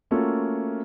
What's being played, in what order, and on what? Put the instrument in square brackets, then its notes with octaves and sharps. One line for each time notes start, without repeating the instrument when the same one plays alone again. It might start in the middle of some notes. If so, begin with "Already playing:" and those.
[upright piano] A3 A#3 C#4 F4 F#4 A4